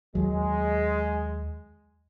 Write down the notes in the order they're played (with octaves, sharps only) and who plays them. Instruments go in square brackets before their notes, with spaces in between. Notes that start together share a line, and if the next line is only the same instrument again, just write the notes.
[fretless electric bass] D#2 F#3 [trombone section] G#3